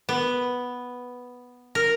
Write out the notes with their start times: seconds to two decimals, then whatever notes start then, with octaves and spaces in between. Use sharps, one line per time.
0.09 B3
1.75 A#4